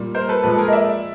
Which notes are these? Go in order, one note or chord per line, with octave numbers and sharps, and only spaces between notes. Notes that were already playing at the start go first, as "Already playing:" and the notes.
Already playing: A#2 G3
A#4 C5
A4 B4
A#2 F3 G#3 A4 B4
G#4 A#4
D#5
D5 E5